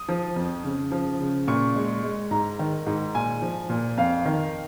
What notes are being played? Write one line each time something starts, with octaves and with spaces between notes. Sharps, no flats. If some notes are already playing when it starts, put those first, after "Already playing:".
Already playing: D#6
F3
F2
C#3
F3
C#3
A#2 C#6
G#3
G#3
G#2 A#5
D#3
G#2
A#2 G#5
F3
A#2
F2 F5
D#3